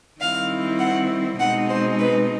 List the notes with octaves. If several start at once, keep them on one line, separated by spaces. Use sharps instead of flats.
D#3 G3 C4 E4 F5
F#5
B2 G#3 C4 D#4 F#5
C5
B4